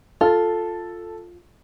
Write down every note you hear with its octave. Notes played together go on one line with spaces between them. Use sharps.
F4 A4